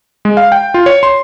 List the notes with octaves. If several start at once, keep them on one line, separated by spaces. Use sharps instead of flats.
G#3
F5
G5
F4
C#5
C6